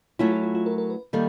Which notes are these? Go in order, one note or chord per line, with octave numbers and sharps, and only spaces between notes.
F#3 A3 C#4 E4 F4
F#4
F4
F4
A#4
A#4
B4
D#3 G3 A#3 A4